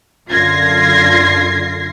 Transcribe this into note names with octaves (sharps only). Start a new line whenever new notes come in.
F#2 D3 F4 G#6 A#6 C7